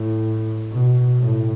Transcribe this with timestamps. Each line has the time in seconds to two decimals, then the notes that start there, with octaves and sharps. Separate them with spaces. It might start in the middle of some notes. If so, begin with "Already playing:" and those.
Already playing: A2
0.72 B2
1.19 A2